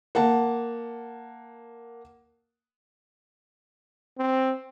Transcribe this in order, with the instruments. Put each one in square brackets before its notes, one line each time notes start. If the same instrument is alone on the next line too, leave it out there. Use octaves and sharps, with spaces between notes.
[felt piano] A#3 F#5 A5
[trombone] C4